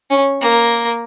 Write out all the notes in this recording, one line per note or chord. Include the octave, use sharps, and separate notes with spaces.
C#4
A#3